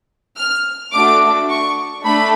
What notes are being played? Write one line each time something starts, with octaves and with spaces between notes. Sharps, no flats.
F6
A3 D4 F#4 A4 D6
C#6
A3 D4 B5